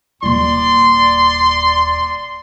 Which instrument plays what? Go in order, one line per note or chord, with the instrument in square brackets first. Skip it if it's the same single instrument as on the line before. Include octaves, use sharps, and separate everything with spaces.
[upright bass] D#1 E4 [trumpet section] D5 C6